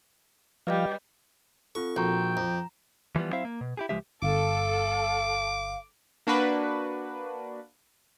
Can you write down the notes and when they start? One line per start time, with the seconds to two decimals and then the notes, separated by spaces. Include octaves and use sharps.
0.67 F3 G3 B4 D#5 F5 G6
1.75 C4 F4 A4 C#6
1.96 A#1 F#4 G5 A#5 C#6
2.37 F2 A#5
3.16 E3 F3 G3 B3
3.32 F#3 C4 E4 C5 E5 F5
3.45 A#3
3.61 B2
3.77 E4 G4 G#4
3.89 C#2 G2 F3 G#3 G4 E5
4.22 G1 A4 F5 D6
6.27 A#3 D4 F#4 B4